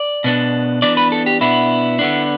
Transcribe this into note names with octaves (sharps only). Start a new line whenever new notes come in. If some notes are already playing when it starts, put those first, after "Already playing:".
Already playing: D5
B2 B3 D4
E3 B3 D4 D5
B4
A4
G4
B2 B3 D4 E4
D3 B3 D4